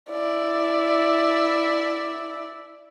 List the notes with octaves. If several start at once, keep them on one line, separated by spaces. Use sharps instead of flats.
E4 D5